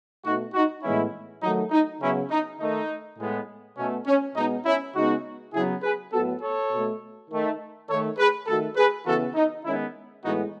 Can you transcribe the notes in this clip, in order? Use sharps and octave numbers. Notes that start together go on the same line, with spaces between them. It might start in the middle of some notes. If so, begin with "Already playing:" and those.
B2 A3 D#4 F#4
D#4 F#4
A2 E3 G#3 B3 C#4 E4
D#3 F#3 A3 D#4
D#4
C#3 F#3 B3 C#4 E4
D#4
D#3 A3 D#4
A2 G#3 B3
B2 A3 C#4
C#4
B2 G#3 B3 D#4
C#4 E4
C#3 G#3 B3 D#4 F#4
C#3 F#3 B3 E4 G#4
G#4 B4
A2 F#3 B3 F#4 A4
A4 C#5
B2 A3
D#3 A3
D#3 A3 A4 C#5
G#4 B4
D#3 A3 F#4 A4
G#4 B4
C#3 E3 B3 F#4 A4
D#4
D#3 G#3 B3 C#4 E4
A2 E3 G#3 B3 D#4 F#4